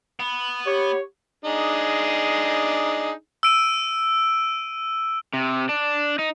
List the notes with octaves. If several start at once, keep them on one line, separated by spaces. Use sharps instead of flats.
B3
G4 C#5
D4 D#4 G#4
E6 D7 D#7
C3
D4
D#4